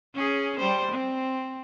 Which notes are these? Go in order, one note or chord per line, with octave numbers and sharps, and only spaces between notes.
C#4 G#4
G3 C5
C4